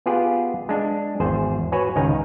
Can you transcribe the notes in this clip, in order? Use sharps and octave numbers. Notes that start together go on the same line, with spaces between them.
B3 F4 G4 G#4 F#5
G#3 D4
G#1 E2 G#4 C5
F#4 B4 C#5 F#5 G#5
C#2 G#2 D#3 G#5 A#5